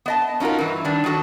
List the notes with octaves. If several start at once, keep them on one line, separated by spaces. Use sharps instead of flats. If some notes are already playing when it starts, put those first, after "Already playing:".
B3 D#5 A5
C#4 D#4 F4 F#4 A#4
G2 E3
D#3 G3 D4
D#3 F#3 F#4 A4